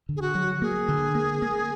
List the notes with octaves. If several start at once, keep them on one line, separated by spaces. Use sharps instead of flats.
D3
G#4
F#4
F#3
A#3 G#4
D3
A#3
A#3